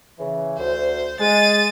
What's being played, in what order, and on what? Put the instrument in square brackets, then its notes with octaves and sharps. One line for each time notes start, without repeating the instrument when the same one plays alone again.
[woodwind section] C#3 E3
[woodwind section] D2 [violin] C5
[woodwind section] G#3 [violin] A6 D#7